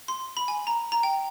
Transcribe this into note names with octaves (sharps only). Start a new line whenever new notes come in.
C6
B5
G#5
A#5
A#5
G5